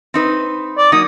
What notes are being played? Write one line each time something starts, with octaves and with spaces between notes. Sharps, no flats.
C4 D#4 B4
D5
F#3 A#3 D#4 D#6